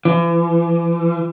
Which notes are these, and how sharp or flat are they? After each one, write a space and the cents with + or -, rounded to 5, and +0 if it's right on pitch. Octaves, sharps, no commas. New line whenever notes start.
E3 +40